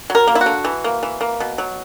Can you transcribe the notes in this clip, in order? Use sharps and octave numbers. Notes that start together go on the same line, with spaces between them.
F#3
A#4
A#3
E4
F#4
D3
E3
A#3
E3
A#3
B2
F#3